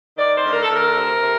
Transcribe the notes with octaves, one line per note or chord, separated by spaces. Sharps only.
D#3 D5
C5
D2
A#4
A4
D2 A#4
C3
C3